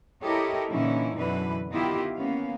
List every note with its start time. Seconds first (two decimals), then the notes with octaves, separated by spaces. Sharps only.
0.22 E4 G4 A4 A#4 C#5 D#5
0.69 A#2 D3 E3 C#4 D#4 E4
1.16 F#2 B2 D3 E3 B4
1.70 D#3 B3 E4 F4 G4 D#5
2.14 A#3 B3 C#4 F5